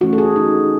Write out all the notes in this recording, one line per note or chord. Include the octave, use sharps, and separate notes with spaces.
E3 A3 C#4 F#4
A4
G#4
D#4